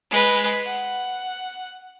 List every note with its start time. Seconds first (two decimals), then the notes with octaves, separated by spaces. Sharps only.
0.11 G#3 B4
0.66 F#5